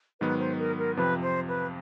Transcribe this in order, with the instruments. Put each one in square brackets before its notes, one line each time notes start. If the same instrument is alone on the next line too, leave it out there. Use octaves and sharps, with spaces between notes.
[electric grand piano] G#2 D#3 F#3 B3 [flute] B4
[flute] C5
A#4
A#4
[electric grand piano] F2 C3 F3 [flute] B4
[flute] C5
B4